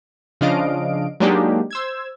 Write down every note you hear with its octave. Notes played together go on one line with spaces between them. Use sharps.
C#3 F3 D4 D#5 F5 D7
F#3 G#3 A#3 D4 D#4 G4
C5 E6 G#6